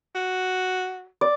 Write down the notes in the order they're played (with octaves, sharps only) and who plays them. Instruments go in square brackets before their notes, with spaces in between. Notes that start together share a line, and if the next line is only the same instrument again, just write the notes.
[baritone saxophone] F#4
[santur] D5